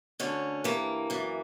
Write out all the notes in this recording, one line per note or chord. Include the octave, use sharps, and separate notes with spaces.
D2 D3 C#4
G2 E3 A#3
F#2 E3